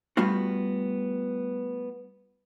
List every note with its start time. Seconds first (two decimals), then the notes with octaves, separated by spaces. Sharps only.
0.17 G3 A3 B3 F4 F#4